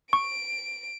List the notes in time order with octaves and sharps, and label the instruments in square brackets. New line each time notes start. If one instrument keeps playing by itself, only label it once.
[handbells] C#6 [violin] D7